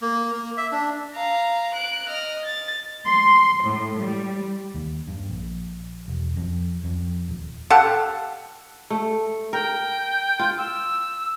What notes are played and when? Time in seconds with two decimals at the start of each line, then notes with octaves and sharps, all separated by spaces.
0.02 A#3
0.33 A#3
0.58 E5
0.72 D4
1.14 F5 A#5
1.75 F#6 D7
2.09 D#5 F6
2.46 A6
3.08 C6
3.65 A2
4.01 G3
4.75 D#2
5.08 G2
5.30 A#1
6.08 E1
6.36 F2
6.84 F2
7.29 D#1
7.70 G4 A4 F5 F#5
8.90 A3
9.53 A#4 G5
10.39 F4
10.58 E6